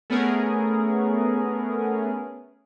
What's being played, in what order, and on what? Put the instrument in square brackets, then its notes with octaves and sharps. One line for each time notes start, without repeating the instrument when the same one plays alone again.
[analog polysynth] A3 B3 C#4 G#4 A#4